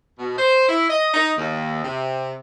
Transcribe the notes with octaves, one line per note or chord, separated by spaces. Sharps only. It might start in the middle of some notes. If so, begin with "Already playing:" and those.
B2
C5
E4
D#5
D#4
D#2
C3